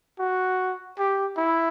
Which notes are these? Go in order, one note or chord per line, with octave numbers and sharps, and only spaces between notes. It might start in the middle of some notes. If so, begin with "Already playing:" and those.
F#4
G4
E4